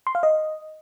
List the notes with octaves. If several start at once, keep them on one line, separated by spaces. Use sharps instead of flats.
C6
F5
D#5